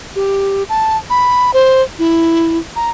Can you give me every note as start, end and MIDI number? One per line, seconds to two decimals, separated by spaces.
0.16 0.63 67
0.69 0.97 81
1.10 1.51 83
1.54 1.82 72
1.99 2.58 64
2.76 2.90 82